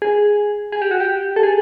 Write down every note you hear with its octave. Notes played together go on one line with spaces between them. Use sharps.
G#4
G#4
G4
F#4
G4
A4
G#4